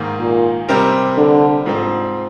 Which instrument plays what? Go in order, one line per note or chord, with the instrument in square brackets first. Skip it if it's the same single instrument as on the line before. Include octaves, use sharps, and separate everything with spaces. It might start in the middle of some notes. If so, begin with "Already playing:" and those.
Already playing: [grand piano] G#2 D#3 A#3
[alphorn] A#2
[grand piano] C3 G3 C4 G4 A#4
[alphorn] D3
[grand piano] G#2 F3 C4